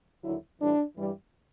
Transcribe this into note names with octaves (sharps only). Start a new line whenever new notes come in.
D#2 D3 F#3 E4
A2 E3 G3 D4
G2 E3 G3